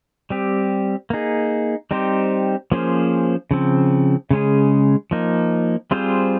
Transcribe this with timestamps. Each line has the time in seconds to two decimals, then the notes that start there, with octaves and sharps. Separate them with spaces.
0.30 G3 C4 G4
1.10 A#3 D#4 G#4
1.91 G3 C4 D#4 G4 C5
2.72 F3 A#3 C#4 G#4 C5
3.51 C#3 F3 C4
4.31 C#3 G#3 C#4 G#4
5.11 F3 A#3 D#4
5.91 G3 C4 F4 G#4 C5